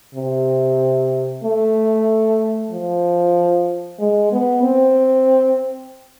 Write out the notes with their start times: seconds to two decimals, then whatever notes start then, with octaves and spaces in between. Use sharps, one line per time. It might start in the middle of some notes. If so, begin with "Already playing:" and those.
0.15 C3
1.44 A3
2.72 F3
4.00 G#3
4.32 B3
4.63 C4